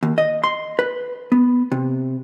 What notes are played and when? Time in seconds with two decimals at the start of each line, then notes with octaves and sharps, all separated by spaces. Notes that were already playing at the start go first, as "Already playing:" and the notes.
0.03 D#2
0.18 D#5
0.44 C6
0.79 B4
1.32 B3
1.72 C3